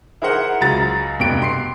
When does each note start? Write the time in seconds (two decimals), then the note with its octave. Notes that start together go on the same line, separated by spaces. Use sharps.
0.22 E4 G#4 A#4 C5 F#5
0.61 C#2 F#3 G#4 A#5 A6
1.19 F1 G2 B2 G5 D7
1.42 C6 C7